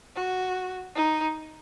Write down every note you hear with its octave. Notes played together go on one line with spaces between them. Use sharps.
F#4
D#4